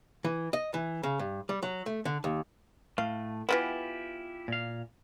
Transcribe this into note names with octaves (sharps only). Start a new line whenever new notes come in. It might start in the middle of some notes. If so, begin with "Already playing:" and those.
E3
D#5
E3
C#3
G2
G3
F#3
A3
D3
D#2
A2 A3 F5
E3 A#3 B3 E4 F4 G4
A#2 F5